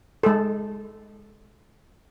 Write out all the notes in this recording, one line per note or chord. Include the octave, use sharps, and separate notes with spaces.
G#3 A4